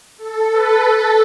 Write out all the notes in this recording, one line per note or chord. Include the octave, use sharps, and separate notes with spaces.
A4
B4
A4